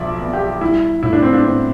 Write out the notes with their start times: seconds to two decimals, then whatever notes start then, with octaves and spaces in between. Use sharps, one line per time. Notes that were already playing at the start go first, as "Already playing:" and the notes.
Already playing: B1 F3 D5 E5
0.20 B3
0.33 G4
0.61 G3 E4
1.03 A2 E4
1.13 D4
1.22 C4
1.33 D4
1.44 B3 C4